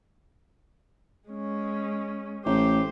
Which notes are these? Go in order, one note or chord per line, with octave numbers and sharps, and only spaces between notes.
G#3 C#4
A1 A3 G4 C5